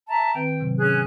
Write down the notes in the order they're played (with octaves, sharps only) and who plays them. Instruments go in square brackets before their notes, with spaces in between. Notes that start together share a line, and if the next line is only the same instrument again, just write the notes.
[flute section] E5 A5 A#5
[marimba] D#3 C4 B4 [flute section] G5
[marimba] G#2 C3 F#3
[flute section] C#4 G#4 F#6